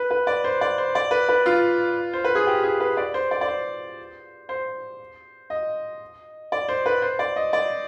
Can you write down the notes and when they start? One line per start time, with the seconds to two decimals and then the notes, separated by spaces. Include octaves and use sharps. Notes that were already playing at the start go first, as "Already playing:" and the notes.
Already playing: B4
0.11 B4
0.27 D5
0.44 C5
0.61 D5
0.78 C5
0.95 D5
1.11 B4
1.29 B4
1.46 F4
2.13 C5
2.24 B4
2.35 G#4
2.47 G4
2.64 G#4
2.80 B4
2.97 D5
3.14 C5
3.31 D5
3.41 D5
3.48 C5
4.49 C5
5.50 D#5
6.52 D5
6.69 C5
6.86 B4
7.02 C5
7.19 D5
7.36 D#5
7.53 D5